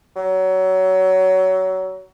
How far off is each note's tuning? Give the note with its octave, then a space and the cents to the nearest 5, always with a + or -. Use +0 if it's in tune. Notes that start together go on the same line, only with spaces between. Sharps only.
F#3 +25